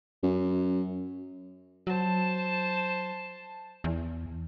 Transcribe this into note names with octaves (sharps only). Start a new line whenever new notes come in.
F#2
F#3 C5 A5
E2